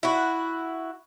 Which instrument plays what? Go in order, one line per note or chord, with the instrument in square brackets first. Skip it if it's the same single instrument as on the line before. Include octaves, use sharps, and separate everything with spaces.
[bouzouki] E4 F#4